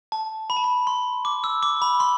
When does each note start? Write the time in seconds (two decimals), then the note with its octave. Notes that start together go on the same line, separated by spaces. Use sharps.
0.12 A5
0.50 B5
0.57 A5
0.64 B5
0.87 C6
1.25 D6
1.44 E6
1.63 D6
1.82 B5
2.00 C6